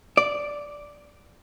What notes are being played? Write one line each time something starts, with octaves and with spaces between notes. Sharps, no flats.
D5